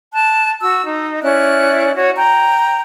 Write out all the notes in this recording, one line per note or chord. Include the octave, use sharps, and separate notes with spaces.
A5 F#6
F#4 E6
D#4
C#4 E4 D5 F#6
F#4 C#5
G5 A#5